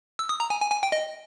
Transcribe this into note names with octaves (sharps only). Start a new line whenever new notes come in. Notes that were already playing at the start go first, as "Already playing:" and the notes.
E6
D#6
A#5
G#5
G#5
G#5
G5
D#5